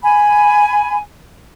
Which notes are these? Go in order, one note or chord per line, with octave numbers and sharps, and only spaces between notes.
G#5 B5